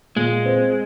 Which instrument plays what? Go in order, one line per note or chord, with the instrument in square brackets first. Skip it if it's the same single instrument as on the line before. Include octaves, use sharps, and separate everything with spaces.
[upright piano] A#2 [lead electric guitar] G#3
[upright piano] C4